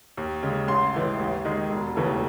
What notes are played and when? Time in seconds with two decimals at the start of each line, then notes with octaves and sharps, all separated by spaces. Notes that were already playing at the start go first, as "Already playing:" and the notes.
0.17 D#2
0.43 C#3 G#3
0.68 A1 C6
0.94 A2 E3 G#3
1.19 D#2
1.45 D#3 G#3
1.70 E1
1.96 D#2 C#3 E3 A3